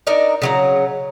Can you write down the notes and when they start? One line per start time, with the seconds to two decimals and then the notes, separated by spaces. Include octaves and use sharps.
0.07 D4 D#4 A#4 D5
0.42 C#3 F#3 A#5